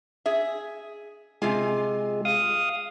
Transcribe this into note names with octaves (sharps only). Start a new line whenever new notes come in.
G#4 E5
C3 G#3 F4 G#5
F5 D#6